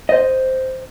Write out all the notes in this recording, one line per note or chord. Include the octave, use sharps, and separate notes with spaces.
C5 D#5